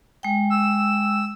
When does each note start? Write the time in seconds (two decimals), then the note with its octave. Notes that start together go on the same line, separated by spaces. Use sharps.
0.23 G#3 G5
0.50 E6